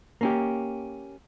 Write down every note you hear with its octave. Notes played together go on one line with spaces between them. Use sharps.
A#3 C#4 G4